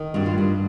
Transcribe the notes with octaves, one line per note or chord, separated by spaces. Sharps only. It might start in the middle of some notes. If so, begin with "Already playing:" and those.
Already playing: D#3
G2 F#4
F4
G2